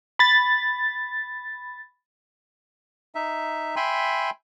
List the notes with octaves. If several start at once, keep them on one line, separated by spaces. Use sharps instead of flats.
B5 A6
D#4 E5
E5 G5 G#5 B5 C6